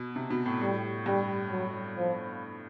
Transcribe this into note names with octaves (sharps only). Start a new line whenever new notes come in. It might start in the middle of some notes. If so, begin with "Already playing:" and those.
Already playing: B2
C3
B2
A2
A2 G3
G2 G3
F#3
F3